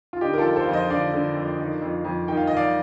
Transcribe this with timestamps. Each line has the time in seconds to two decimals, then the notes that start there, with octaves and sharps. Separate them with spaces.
0.13 F4
0.21 D3 D#4 G4
0.33 A#4
0.38 F4 A4
0.45 F2
0.56 A4 C5
0.65 F2 F5
0.73 C5 D#5
0.90 D3 D5 F5
1.14 D3
1.36 F2
1.59 D#3
1.82 F2
2.05 F2
2.28 D#3 G5
2.37 F5
2.47 D#3 D#5
2.57 D5 F5